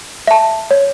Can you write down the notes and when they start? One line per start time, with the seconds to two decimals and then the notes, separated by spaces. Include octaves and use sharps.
0.27 E5 A5
0.71 C#5